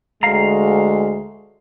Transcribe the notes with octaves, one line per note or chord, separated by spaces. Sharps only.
D2 G#3 F5 A#5